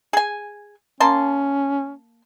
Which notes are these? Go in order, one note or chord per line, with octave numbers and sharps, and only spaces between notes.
G#4 G#5
A#3 C#4 A5 C6